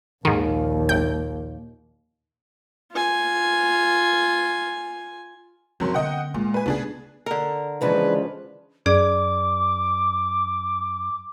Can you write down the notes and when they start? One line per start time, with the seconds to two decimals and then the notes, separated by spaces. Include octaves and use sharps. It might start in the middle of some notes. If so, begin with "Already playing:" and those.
0.25 A#1 D#2 G#2 D#3
0.89 G#1 G5
2.92 F4 G#5
5.80 F#1 F#3 C4 C6
5.94 D3 B3 D#5 F#5 G5
6.34 A#2 G#3
6.54 B4 G#5
6.66 C#3 A3 B3 D4 G#4
7.26 D3 A#4
7.81 D#2 C#3 E3 F3 G#3 D4 B4
8.86 F#2 G#4 D5 D6